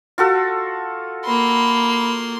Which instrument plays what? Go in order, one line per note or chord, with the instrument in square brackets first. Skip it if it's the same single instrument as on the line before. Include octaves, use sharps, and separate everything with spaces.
[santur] F4 F#4 A4
[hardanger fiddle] A#3 C6 [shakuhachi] B5